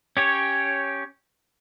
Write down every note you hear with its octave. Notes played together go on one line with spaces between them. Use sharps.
C#4 G4 C#5